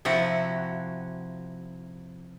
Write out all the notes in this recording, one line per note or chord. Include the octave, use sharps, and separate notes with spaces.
C3 F3 E4 F#4